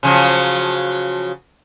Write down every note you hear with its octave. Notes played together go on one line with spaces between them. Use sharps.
C#3 F3 F#3